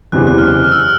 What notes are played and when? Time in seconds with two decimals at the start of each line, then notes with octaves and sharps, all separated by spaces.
0.12 F#1 E2 C3 E3 F#6
0.27 F#6
0.38 F6
0.64 F6
0.72 E6
0.80 F6